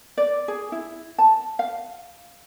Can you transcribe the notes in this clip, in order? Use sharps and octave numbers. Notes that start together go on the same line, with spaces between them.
D5
G#4
E4
A5
F5